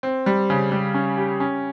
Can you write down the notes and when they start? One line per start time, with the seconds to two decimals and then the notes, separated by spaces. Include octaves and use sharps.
0.03 C4
0.26 G3
0.50 C#3
0.72 G3
0.94 C#4
1.17 G4
1.40 C#4